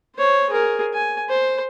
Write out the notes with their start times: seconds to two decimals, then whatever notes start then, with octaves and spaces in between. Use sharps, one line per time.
0.15 C5 C#5
0.50 G#4 A#4
0.94 G#5
1.29 C5